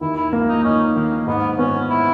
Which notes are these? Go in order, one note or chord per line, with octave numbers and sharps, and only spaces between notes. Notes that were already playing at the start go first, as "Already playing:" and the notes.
D#2 E4
E4
A#3
D#4
C#4 D#4
D#3 A#3
G#2 B3
B3 C#4
E4